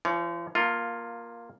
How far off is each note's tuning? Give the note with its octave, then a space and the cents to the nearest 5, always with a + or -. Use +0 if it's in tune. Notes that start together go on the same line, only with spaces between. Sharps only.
F3 -40 C#5 +15
A#3 +10 F4 +5 A4 +45